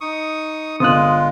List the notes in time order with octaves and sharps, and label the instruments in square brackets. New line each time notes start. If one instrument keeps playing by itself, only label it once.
[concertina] D#4 C#6 D#6
[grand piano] G1 [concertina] G#3 F4 [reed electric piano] D#6 F#6